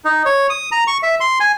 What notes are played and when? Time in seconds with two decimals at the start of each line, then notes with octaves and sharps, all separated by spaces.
0.05 D#4
0.26 C#5
0.50 D#6
0.72 A#5
0.87 C#6
1.03 E5
1.20 C6
1.40 G#5